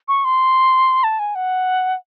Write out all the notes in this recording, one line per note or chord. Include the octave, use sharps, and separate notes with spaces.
C#6
C6
A5
G#5
F#5